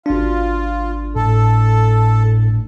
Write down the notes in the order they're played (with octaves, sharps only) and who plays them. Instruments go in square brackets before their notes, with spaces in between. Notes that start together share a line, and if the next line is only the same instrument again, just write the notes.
[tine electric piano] G#1 D4 [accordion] F4
[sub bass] A2 [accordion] A4